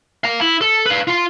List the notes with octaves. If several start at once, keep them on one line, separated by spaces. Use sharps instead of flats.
F5 A#5
E4
A4
B4 F5
F4 C6